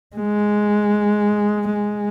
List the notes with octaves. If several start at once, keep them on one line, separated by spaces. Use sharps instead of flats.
G#3
G#3